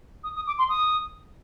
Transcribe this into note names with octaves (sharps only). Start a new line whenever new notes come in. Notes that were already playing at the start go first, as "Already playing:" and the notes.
D#6
D#6
D6
C6
D#6